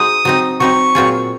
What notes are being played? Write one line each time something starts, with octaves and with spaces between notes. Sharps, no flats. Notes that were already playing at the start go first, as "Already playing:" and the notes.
Already playing: G#3 D#4 F#4 C5 D#6
F#3 C4 D#4
F#3 C4 D#4 C#6
A#2 F#3 C4 F4 G#4